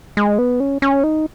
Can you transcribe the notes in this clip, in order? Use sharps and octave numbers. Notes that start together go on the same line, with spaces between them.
G#3
B3
C#4
C#4
D#4